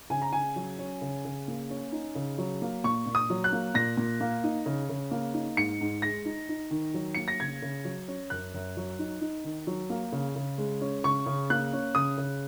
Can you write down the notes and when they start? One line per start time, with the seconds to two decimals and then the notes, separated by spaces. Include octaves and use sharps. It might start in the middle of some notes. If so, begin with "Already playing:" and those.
0.10 C#3 G#5
0.22 A#5
0.33 C#3 G#5
0.56 F#3
0.78 C#4
1.01 C#3
1.25 C#3
1.48 A#3
1.70 C#4
1.92 D#4
2.15 C#3
2.38 F#3
2.62 A#3
2.84 A#2 C#6
3.06 A#2
3.15 D#6
3.30 F#3
3.44 F#6
3.53 A#3
3.74 A#2 A#6
3.97 A#2
4.21 A#3
4.44 D#4
4.66 C#3
4.89 C#3
5.11 A#3
5.34 D#4
5.57 G#2 C#7
5.81 G#2
6.02 G#3 A#6
6.25 D#4
6.49 D#4
6.71 D#3
6.94 F#3
7.15 A#3 C#7
7.28 A#6
7.40 C#3 G#6
7.62 C#3
7.85 F#3
8.08 C#4
8.30 F#2 F#6
8.54 F#2
8.77 F#3
8.99 D#4
9.21 D#4
9.44 D#3
9.67 F#3
9.90 A#3
10.12 C#3
10.36 C#3
10.58 G#3
10.81 C#4
11.04 C#3 C#6
11.26 C#3
11.50 A#3 F#6
11.73 C#4
11.95 C#3 D#6
12.18 C#3